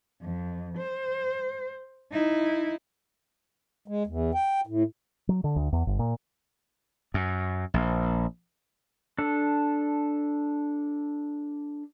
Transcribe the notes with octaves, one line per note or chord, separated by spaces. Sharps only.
F2
C5
D#4 E4
G#3
E2
G5
A2
F#3
D3
D2
E2
G1
A#2
F#2
A#1
D4 A4